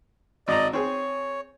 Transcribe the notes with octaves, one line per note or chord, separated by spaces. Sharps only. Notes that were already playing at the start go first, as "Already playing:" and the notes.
G#1 D5 D#5 A#5
C4 G#4 C#5